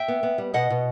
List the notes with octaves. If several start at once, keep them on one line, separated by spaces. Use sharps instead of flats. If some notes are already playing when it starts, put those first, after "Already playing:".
Already playing: E5 G5
B3
B3
G3
B2 D#5 F#5
B2